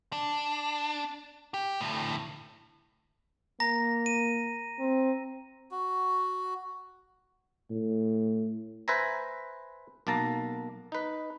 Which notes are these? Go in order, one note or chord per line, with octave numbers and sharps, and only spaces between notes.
D4
G4
D2 A2
A#3 A#5 A#6
D#7
C4
F#4
A2
B4 C5 E5 G#5 A#5
B1 A#3 A5 A#5
D#4 B4